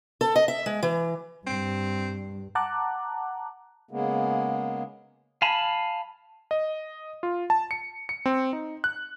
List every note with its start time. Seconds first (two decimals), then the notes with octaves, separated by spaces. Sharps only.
0.21 A4
0.36 D#5
0.48 E5
0.66 G#3
0.83 E3
1.47 G2 C4
2.55 F#5 A5 A#5 D6 F#6
3.91 C#3 G#3 A#3 B3
5.42 F5 G#5 A5 B5
6.51 D#5
7.23 F4
7.50 A5
7.71 C#7
8.09 C#7
8.26 C4
8.53 D#4
8.84 F#6